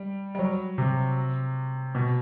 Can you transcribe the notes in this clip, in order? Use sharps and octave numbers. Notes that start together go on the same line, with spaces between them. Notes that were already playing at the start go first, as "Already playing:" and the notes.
Already playing: G3
G3
F#3
C3
B2